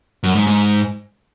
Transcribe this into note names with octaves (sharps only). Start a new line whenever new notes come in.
F#2
G#2
G#2